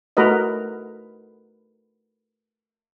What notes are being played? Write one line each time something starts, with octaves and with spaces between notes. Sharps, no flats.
A3 F#4 A#4 B4 D#5